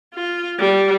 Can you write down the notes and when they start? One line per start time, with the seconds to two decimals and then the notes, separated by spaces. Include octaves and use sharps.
0.15 F4
0.59 G3